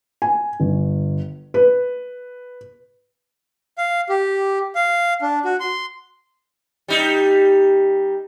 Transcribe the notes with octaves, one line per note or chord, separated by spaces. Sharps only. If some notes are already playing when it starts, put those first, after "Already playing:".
G#5
G1
B4
F5
G4
F5
D4
F#4
C6
G3 D#4